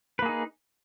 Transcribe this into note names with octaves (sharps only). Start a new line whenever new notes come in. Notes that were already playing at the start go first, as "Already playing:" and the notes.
A#3 D#4 G#4 B4